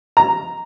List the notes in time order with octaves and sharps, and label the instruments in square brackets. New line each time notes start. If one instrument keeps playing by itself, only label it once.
[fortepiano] A#5